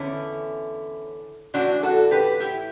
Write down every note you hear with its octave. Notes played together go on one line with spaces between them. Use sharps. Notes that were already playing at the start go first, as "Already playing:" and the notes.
Already playing: E2 D3 C#4 E4
A2 E3 D4 F#4
F#4 A4
G4 B4
E4 G4